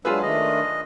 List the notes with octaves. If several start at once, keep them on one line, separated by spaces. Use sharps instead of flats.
F#3 G#3 D4 F4 G#4 B4 E6
D#3 A3 D4 D#5